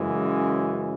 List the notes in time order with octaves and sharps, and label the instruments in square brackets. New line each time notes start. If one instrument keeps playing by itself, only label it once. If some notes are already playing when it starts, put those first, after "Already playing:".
Already playing: [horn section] F#2 C#3 E3 G#3